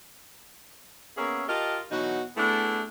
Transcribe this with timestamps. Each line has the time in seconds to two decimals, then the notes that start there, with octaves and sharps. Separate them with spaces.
1.17 A#3 B3 C#4 G#4 E5
1.48 F4 G4 A#4 D#5 A5
1.91 B2 E3 F#3 D#4 F#4
2.36 A3 B3 D4 E4 G#4